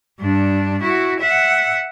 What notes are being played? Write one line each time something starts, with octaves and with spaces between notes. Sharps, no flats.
G2 D4
E4 F#4
E5 F#5